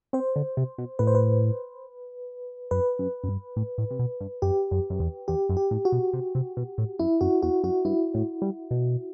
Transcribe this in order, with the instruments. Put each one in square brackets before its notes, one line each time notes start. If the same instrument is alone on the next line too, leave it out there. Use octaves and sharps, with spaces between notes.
[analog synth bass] C4 [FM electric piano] C5
[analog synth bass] D3
C3
B2
[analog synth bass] A2 [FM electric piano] B4
[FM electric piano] C5
B4
[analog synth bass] F#2 [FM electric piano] B4
[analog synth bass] F#2
F#2
G2
A2
A2
C3
B2
G2
[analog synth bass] F#2 [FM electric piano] G4
[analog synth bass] F#2
F#2
E2
[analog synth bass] E2 [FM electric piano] G4
[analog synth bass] F#2
[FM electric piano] G4
[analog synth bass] A2
[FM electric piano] F#4
[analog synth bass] B2
C3
C3
B2
A2
[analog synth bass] F#2 [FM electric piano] E4
[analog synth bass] F#2 [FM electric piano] F#4
[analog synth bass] E2 [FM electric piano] F#4
[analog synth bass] F#2 [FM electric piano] F#4
[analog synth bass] G2 [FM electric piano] E4
[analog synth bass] A2
G3
B2